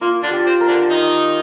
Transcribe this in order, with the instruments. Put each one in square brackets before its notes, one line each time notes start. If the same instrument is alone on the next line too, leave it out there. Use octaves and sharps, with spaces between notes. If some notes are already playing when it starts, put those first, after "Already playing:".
[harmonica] A#3 [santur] F4
[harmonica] D3 D4
[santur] G4
[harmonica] C4
[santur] A#4
[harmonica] D3 D4
D#3 D#4